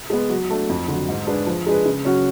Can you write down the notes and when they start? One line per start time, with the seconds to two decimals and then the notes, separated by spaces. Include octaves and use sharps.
0.10 G#3 B3
0.29 F#3
0.50 A3 D4
0.69 F2
0.88 D3 F#3
1.08 G#2
1.27 G#3 D4 G#4 B4
1.46 F3
1.67 G#3 D4 G#4 B4
1.85 C#3
2.05 F#3 C#4 F#4 C#5